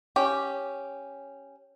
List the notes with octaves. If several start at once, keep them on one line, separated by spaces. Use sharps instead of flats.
C#4 G4